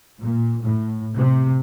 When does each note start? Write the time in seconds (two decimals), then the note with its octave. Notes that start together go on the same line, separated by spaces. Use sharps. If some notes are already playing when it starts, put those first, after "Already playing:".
0.21 A#2
0.64 A2
1.16 C3